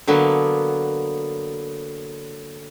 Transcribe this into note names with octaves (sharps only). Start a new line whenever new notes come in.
D3 F#3 A#3 B3